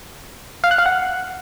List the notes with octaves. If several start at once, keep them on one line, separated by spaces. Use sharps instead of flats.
F5
F#6
F5
F#5